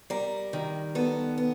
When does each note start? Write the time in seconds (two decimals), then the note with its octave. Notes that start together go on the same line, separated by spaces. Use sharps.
0.10 G3 A#4
0.53 D#3
0.95 B3 A4
1.38 B3